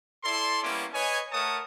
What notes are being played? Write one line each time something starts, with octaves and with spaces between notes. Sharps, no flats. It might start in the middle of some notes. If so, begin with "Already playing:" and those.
E4 A4 D5 C6
G3 A#3 B3 C#4 E4 D6
B4 C#5 D#5 G#5
A3 A#4 C#5 F#5 A5 D#6